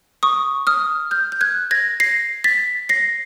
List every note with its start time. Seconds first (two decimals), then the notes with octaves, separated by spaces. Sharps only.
0.23 C#6 D#6
0.67 D#6 F6
1.11 F6 G6
1.32 G6
1.41 F#6 G#6
1.71 G#6 A#6
2.00 A#6 C7
2.44 A6 B6
2.89 A#6 C7